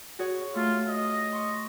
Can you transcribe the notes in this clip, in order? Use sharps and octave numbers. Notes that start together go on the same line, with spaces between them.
F#4 G#4 C#5
A3 F4
D#5
C6 C#6